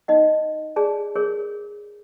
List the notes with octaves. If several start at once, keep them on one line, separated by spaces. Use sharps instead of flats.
D#4 D#5 F#5
G#4 D5 A5
G#4 A#4 C#5